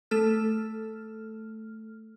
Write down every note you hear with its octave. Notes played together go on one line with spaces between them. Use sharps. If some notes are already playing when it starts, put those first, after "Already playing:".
A3 A4 F6